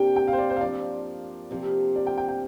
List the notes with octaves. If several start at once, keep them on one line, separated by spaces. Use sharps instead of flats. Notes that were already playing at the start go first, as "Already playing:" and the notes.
Already playing: C3 A#3 D4 F4 G5
G5
F5
C5
D5
C5
F5
F3 D4 F4 D5
C3 F3 A#3 F4
D5
G5
G5
G5